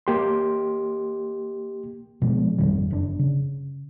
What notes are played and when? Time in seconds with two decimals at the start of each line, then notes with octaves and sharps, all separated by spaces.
0.07 A#3 G4 C6
2.22 B2 F3 G#3
2.58 G#1 F2 D#3 G3
2.90 F#1 B2 D4
3.19 C#3